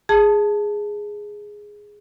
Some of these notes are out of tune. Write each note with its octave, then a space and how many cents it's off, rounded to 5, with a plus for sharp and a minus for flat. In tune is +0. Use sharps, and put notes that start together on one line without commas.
G#4 +0 A5 +0